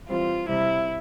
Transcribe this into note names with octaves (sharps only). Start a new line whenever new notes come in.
E3 G3 C4 F4
C3 G3 C4 E4